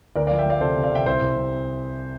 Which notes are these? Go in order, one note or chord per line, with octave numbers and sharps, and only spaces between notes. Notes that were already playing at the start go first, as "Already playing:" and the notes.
D2 A#4 D5
D5 F5
F3
E5 G5
F3 D5 F5
C3 A4 C5
C3
D5 F5
C3 E5 G5
C2 C5 E5
C2
C3